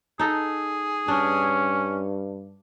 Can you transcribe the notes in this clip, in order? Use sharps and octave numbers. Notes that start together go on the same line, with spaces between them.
D#4 G#4 A4
G2 C#4 D4